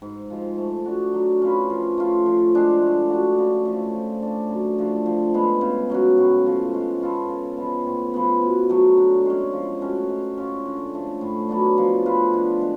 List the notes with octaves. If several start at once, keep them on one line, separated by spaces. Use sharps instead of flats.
G#2
F3 G#3
A3
D4 F#4
F#3
C#4 F4 B4
F3
A3 F4
F3
G#3 D4 G#4
A3
D4 F#4
C#3
F3 A3
F3
A3 D4
F#2
D3 F3 A3
F3
G#3 B3
C#3
F#3 C#4 F#4
A2
F3 A3
G#3
B3 F4 A4
C#3
F3 G#3 B3
A2
F3 B3
B2
F#3 A3
D3
G#3 C#4
F3
A3 C#4 F#4
G#3
C#4 F4
D3
F3 A3
A2
F#3 B3 D4
F3
A3 F4 B4
D3
G#3